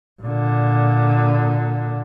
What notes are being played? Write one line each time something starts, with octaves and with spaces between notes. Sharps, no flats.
A#2 D3